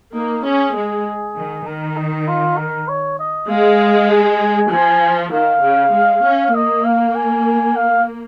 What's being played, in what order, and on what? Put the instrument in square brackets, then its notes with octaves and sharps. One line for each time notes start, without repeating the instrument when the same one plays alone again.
[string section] A#3 [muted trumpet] D#4
[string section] C#4 [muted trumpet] G#4
[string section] G#3
D#3
[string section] D#3 [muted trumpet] A#4
[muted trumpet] D#4
F4
A#4
C#5
D#5
[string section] G#3 [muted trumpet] F5
[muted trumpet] G#5
[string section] F3 [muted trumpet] G#5
[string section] D#3 [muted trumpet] F5
[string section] C#3
G#3
C#4
[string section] A#3 [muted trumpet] D#5
[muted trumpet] F5
G#5
F5